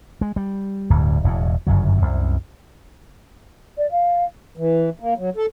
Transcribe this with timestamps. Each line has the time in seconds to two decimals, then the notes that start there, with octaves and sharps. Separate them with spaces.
0.21 G#3
0.36 G3
0.90 D1 D2 G2
1.24 E1 E2 A2
1.67 G1 F#2 C#3 F#3
1.98 C2 F#2
3.77 D5
3.91 F5
4.57 E3
5.00 A#3
5.18 F#3
5.36 A4